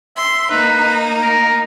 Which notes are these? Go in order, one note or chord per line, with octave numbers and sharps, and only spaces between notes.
E5 C6
A#3 D#4 B4
A#4